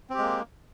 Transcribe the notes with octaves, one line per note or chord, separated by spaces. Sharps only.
G#3 A#3 C4 G4